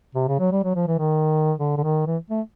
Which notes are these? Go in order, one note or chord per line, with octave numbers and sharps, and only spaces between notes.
C3
C#3
F#3
G3
F#3
F3
E3
D#3
D3
D3
D#3
E3
A3